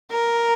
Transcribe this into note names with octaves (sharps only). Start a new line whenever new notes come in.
A#4